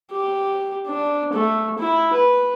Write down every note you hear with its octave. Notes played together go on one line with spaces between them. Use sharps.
G4
D4
A3
E4
B4